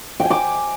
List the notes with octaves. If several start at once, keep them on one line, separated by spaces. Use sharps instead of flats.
G5
G#5
D6